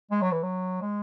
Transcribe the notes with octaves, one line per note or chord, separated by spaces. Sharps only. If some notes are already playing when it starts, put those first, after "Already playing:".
G#3
F#3
E3
F#3
G#3